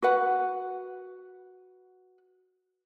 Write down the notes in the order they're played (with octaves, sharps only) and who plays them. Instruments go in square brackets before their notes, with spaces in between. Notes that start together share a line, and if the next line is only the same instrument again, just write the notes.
[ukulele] F#4 B4 F#5